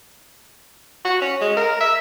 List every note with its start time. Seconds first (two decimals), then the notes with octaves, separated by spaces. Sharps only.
1.05 F#4
1.22 C#4
1.41 G#3
1.57 A#4
1.81 E5